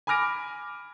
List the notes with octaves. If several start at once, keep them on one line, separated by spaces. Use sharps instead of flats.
G#5 B5 D6 F6 A#6 D7